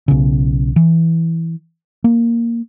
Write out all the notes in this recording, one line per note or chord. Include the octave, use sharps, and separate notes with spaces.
B1 C#3
E3
A#3